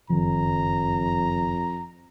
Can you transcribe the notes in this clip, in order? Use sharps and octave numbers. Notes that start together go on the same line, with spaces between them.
F#1 F2 D#3 F3 A#5